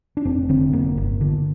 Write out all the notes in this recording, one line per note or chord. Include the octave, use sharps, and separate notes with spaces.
D4
F1 C4
D3 C4
F1 A#3
G1
D3